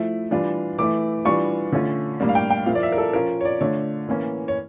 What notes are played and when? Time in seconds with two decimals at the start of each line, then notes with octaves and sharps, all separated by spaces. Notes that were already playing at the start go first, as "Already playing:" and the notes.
Already playing: F3 A3 E4
0.31 E3 G3 D4 F4
0.78 E3 A3 E4 D6
1.25 E3 G3 D4 F4 C#6
1.72 D3 A3 C#4 F4
2.20 A2 G3 A#3 D4
2.29 F5
2.35 G5
2.50 G5
2.66 A#2 F3 A#3 E4 F5
2.75 D5
2.83 E5
2.92 A#4
2.98 A4
3.13 F3 C#4 F4 A#4
3.41 C#5
3.45 D5
3.61 D3 A3 D4 F4 C#5
4.08 A2 E3 A#3 C#4
4.48 C#5